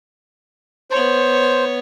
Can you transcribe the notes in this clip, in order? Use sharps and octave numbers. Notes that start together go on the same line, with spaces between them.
B3 C5 C#5